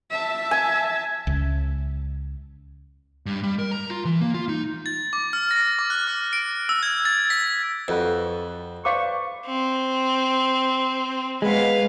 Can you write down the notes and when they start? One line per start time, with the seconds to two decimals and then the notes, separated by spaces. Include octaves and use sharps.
0.11 E5 A5
0.51 G#5
1.27 C#2
3.26 G2
3.43 G3
3.59 A#4
3.71 A#5
3.90 F4
4.05 E3
4.21 A#3
4.34 F4
4.49 D#4
4.86 A6
5.13 D6
5.33 F6
5.51 A#6
5.79 D6
5.90 F#6
6.07 F6
6.33 D7
6.69 E6
6.83 G#6
7.05 A6
7.30 B6
7.88 F2 C4 F#4 B4
8.85 B4 C5 D5 F5 C#6 D6
9.46 C4
11.42 G#3 B3 B4 F5